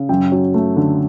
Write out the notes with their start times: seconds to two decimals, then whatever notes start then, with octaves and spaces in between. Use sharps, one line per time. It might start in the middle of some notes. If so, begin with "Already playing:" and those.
Already playing: C#3
0.09 F#2 G5
0.32 F#3
0.54 A3
0.76 D3